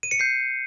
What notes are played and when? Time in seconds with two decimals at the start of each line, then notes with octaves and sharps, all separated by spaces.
0.03 D#7
0.11 C#7
0.19 G6 C7